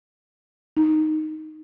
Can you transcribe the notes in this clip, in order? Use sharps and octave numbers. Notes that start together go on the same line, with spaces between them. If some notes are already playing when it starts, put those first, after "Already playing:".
D#4